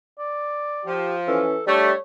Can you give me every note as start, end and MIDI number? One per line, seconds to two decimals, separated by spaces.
0.19 0.90 74
0.85 1.40 53
0.85 1.15 67
1.28 1.60 52
1.28 1.56 61
1.28 1.62 69
1.67 1.93 55
1.67 1.91 57
1.67 1.92 62
1.67 2.02 73